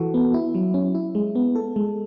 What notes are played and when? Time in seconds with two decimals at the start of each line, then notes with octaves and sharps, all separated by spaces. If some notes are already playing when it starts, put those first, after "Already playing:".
Already playing: E3 F#4 A4
0.14 B3
0.34 E4
0.55 F#3
0.74 C#4
0.95 E4
1.15 G#3
1.35 B3
1.56 A4
1.76 G#3